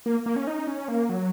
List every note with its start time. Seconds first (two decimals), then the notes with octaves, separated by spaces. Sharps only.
0.06 A#3
0.26 A#3
0.36 C#4
0.47 D#4
0.67 C#4
0.88 A#3
1.09 F#3